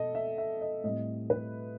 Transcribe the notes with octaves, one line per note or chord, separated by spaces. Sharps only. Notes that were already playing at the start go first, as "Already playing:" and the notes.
Already playing: B2 A4 D#5
E5
E5
D#5
A2 G3 C4 D#5
B4